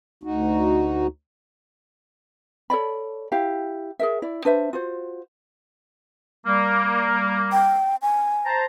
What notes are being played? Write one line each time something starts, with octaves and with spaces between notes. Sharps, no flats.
D2 D#4 F#4
A4 C#5 D5 B5
E4 G4 F5
G#4 A#4 E5
E4 D5
D4 B4 C5 E5
F4 F#4 C5
G3 A#3
G5
G#5
C5 A5 A#5